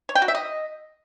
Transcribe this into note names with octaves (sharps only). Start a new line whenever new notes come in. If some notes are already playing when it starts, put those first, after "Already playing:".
C#5
G5
F#4
E5
D#5